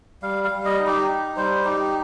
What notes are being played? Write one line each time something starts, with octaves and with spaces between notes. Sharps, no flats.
G3 F5
F5
G3
D#5
D#4
G4
D#4
G3 C5
D#4 G4